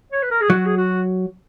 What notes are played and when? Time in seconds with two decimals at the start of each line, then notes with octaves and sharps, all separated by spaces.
0.12 C#5
0.22 B4
0.31 A#4
0.41 G#4
0.50 F#3 F#4
0.66 G#4
0.77 F#4